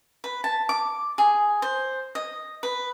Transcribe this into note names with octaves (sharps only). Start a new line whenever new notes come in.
B4
A5
D6
G#4
C5
D#5
B4